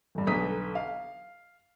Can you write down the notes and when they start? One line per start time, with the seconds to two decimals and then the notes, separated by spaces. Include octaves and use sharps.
0.15 G1 G2
0.27 B1 D3 B3 A#5 D#6 B6
0.75 F5